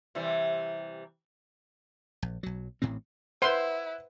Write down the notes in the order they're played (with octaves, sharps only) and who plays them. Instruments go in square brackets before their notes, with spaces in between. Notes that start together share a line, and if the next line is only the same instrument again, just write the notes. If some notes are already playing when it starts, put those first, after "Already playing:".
[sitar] C3 E3 G3
[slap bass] A#1
B1 F#3
A1 A2 E3 C4
[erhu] E4 [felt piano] B4 F#5 [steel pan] C5 C6